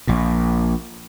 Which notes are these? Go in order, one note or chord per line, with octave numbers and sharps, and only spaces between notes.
A#1 A#2